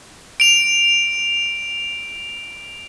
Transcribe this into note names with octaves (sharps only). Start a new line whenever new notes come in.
D7 F7